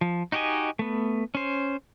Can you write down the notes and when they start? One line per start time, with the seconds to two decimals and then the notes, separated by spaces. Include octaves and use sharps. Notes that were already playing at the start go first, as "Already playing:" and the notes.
0.01 F3
0.32 D#4 F#4 G4 D#5 G#5
0.79 A3 B3
1.35 C#4 C5